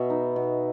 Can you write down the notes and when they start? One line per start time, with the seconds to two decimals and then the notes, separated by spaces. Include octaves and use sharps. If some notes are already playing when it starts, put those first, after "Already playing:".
Already playing: B2 E5
0.10 D#4
0.36 B2